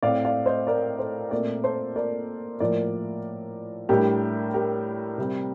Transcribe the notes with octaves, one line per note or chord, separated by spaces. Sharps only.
A2 A3 C4 D5 F5
D5 F5
C5 D#5
A#4 D5
A4 C5
A#2 A3 C4 A#4 D5
A4 C5
A#4 D5
A2 F3 A#3 A#4 D5
A2 G3 D4 G4 A#4
G4 A#4
C3 G3 C4